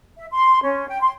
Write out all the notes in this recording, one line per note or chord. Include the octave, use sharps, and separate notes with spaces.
E5
C6
C#4
G5
C6